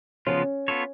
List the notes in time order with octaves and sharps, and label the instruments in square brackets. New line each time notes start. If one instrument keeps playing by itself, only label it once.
[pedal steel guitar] C#3 F3 B3 F4 [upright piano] C#4
[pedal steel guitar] B3 F4 A4 C#5